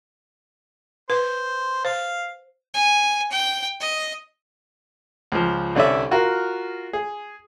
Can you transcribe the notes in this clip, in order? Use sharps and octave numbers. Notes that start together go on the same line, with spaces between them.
B4 C5
C5 F5
G#5
G5
D#5
C#2 F3
C2 D3 C#4 D5 E5
F4 F#4 A#4
G#4